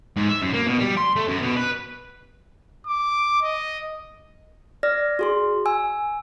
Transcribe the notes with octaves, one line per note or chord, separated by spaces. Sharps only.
G#2
E5
F#2
A#3
B2
G3
C6
A3
F#2
B2
B4
D6
D#5
D5 F6 A#6
F#4 G#4 C6
G#5 E6